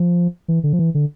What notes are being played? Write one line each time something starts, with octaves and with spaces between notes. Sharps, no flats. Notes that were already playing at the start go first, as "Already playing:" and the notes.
Already playing: F3
E3
D3
F3
E3
D3